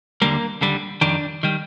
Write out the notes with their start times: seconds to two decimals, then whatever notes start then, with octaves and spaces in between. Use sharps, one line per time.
0.22 D#2 D3 G3 A#3
0.61 D#2 D3 G3
1.01 F2 D#3 G3 D4
1.43 D#3 G3